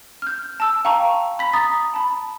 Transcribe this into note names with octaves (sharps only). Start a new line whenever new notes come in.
F6 G6
A5 E6
F5 G5 A5 A#5 C#6
B5 B6
A#5 D#6 A6
A5 B5